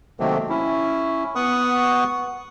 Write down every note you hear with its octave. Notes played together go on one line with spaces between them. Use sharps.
C3 D#3 F#3 A3 A#3 C4
C#4 E4
B3 F#5 C#6 D#6